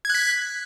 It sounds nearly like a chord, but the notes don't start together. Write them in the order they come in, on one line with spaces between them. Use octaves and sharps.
G#6 F#6 B6